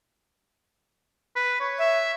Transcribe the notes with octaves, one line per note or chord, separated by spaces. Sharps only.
B4
C#5
E5